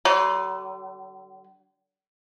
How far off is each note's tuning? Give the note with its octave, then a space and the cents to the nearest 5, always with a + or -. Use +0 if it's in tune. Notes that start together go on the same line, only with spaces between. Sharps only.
D3 +0 F#3 +45